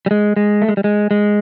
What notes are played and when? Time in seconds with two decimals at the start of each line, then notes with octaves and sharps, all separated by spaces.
0.06 G3
0.11 G#3
0.36 G#3
0.62 A3
0.69 G#3
0.77 G3
0.84 G#3
1.11 G#3